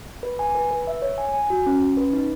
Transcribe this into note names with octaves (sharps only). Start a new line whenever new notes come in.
B4
G#5
B4
B4
E5
C#5
G#5
G#5
F#4
C#4
C#4
B4
D#4